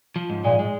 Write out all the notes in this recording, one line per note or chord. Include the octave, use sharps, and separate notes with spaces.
F3
G#2
A#2 G#3
G#3